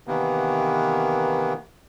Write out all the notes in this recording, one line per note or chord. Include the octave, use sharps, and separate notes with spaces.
C3 D#3 E3 A#3 B3